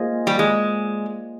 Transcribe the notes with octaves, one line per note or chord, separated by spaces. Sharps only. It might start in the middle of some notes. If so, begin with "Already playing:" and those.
Already playing: A#3 F4 G#4 C5 D#5
G3
G#3